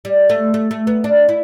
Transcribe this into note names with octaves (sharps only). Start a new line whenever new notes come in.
G3
A3
A3
A3
B3
D4
E4